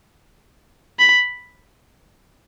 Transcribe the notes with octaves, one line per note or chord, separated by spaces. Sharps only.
B5